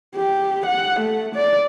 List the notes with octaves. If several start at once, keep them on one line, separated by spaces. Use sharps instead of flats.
G4
F#5
A3
D5